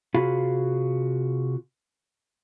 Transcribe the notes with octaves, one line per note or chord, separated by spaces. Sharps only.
C3 F4 F#4 G#4 F5 B5